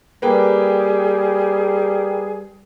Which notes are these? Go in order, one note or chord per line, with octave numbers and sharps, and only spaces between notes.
G3 A#3 G#4 B4 G5